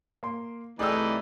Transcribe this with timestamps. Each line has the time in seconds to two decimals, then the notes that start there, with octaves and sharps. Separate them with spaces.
0.23 A#3 C6
0.79 C2 E3 A3 D#4 G#4 D5 G5 E6